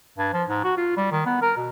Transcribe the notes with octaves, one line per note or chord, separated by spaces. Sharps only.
G2
F3
G#2
F#4
F4
G3
D#3
B3
A#4
B2